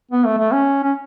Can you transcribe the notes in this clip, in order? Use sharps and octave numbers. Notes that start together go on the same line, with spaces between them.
B3
A3
A3
C#4
C#4